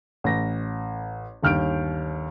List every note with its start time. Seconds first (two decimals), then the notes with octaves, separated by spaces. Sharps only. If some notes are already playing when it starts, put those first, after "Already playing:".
0.24 A1 A#6
1.43 G1 D#2 F6 G6 D7